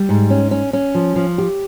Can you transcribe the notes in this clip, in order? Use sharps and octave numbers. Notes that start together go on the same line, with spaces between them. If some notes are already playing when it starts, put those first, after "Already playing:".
Already playing: G3
G#2
C#4
C#4
C#4
F3
F3
G4